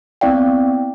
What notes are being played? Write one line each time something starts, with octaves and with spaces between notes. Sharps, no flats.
B3 C4 E4 D5 F5 G5